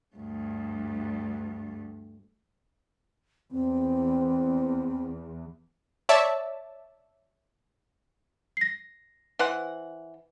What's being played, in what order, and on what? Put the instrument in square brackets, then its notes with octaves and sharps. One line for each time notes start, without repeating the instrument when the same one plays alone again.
[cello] D2 G2
[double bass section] E2 [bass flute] C4
[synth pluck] C#5 D5 E5 A5
[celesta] A#6 C7
[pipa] E3 C5 F#5